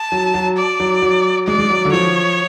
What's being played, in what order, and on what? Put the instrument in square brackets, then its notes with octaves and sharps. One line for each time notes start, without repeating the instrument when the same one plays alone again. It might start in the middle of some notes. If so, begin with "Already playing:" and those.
Already playing: [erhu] A5
[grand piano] F#3
F#3
[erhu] D5
[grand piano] F#3
F#3
[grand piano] G#3 [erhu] D5
[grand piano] G#3
F#3
D3
[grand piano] F3 [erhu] C#5